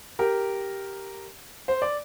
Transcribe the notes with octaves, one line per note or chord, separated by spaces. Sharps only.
G4 A#4
C5
D5